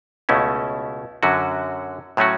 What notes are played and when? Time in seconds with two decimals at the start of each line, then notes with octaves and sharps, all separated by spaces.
0.29 C#2 B2 A3 C#4 E4
1.23 F#2 D3 F#3 C#4 F#4
2.17 A2 F#3 A3 C#4 F#4